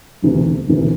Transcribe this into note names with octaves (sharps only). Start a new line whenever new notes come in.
E1 D2 C3 E3
E1 D2 C3 E3